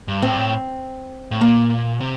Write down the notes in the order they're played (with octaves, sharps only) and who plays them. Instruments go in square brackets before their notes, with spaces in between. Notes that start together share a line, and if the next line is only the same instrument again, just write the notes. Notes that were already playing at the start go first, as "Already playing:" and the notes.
[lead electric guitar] G2
[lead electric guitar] A2 [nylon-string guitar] C4
[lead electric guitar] G2
A2
A2
[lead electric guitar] A#2 [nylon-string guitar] A#3
[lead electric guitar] C3